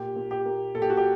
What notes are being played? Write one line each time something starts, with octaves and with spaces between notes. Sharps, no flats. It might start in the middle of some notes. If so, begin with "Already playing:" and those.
Already playing: A#2 G4
A#2
G4
A#3
A#2 A4
G4
F#4
G4